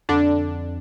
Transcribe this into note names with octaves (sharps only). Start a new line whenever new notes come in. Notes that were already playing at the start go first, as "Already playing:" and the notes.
F2 D3 D4